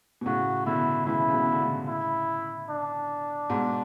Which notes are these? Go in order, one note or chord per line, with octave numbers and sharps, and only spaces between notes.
B2
A2 C#3 F#4
B2 D3 E4
C#3 E3 E4
C#3
B2 D3
D3
A2 C#3
E4
D4
G#2 B2